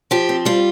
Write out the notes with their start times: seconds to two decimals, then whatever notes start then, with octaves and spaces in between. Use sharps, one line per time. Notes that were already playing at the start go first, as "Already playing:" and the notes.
0.11 F3 G4
0.29 C4
0.45 G3 F4